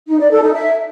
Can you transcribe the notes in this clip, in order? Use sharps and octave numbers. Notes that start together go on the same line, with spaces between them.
D#4
D5
A4
D#4
E5